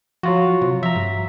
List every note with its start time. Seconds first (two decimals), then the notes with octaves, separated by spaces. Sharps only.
0.23 F3 F#3 F4 F#4
0.62 C3
0.83 F3 E5 A#5
0.96 G2